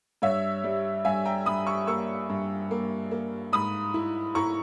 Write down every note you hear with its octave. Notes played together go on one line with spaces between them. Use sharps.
G2 C#5 E5
G3
G2 E5 G#5
G5 A#5
G2 B5 D#6
C#6 E6
A#3 C#6 E6
G2
A#3
A#3
G#2 B5 D#6
E4
E4 A#5 C#6